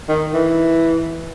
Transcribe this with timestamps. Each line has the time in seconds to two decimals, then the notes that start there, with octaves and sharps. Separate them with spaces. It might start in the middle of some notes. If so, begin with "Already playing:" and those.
0.09 D#3
0.33 E3